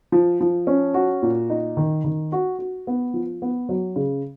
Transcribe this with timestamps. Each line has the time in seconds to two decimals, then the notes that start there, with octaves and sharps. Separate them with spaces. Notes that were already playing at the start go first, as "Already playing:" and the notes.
0.12 F3
0.40 F3
0.67 C#4
0.94 F#4
1.23 A#2
1.50 D#4
1.77 D#3
2.04 D#3
2.32 F#4
2.59 F#4
2.87 B3
3.14 F3
3.42 B3
3.69 F#3
3.96 C#3